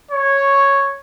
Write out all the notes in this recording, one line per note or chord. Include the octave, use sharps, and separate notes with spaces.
C#5